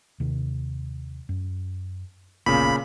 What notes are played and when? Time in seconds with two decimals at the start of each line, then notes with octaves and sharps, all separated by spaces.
0.20 D#2 C3 D#3
1.29 F#2
2.46 D1 G#1 A#2 C#3 B3 B5